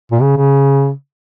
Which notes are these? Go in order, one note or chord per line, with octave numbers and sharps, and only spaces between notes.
A#2
C#3
C#3